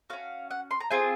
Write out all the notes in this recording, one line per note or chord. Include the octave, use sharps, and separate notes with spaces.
C#4 F#4 F5
F#5
C6
A#5
C4 F4 G#4 G#5